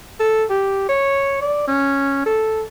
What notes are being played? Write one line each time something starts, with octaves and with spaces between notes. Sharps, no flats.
A4
G4
C#5
D5
C#4
A4